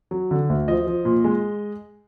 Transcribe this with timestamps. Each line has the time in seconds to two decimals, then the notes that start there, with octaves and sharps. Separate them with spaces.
0.11 F#3
0.31 D3
0.50 D2
0.68 F3 D#5
0.87 F3
1.05 A#2
1.24 G#3